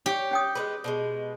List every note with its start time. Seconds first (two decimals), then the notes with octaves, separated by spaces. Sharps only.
0.06 G4 C#5
0.31 C#4 G5 D#6
0.55 G#3 B3 B4
0.84 B2 D3 G#3